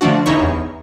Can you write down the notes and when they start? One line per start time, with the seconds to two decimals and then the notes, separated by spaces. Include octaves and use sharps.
0.01 D3 F3 A3 D4 F#4
0.26 G1 D#4 E4 C#5
0.41 E2